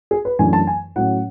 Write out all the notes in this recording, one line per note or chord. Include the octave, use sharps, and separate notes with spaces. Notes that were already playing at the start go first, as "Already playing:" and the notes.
G#4
B4
F#2 E3 A3 D4 G#5
A5
G#5
A2 F#3 A3 C#4 F#5